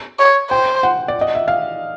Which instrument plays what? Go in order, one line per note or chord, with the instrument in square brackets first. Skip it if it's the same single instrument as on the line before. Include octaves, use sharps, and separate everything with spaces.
[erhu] C#5
[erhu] C5 [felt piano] G5
[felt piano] F#5
D5
D#5
E5
F5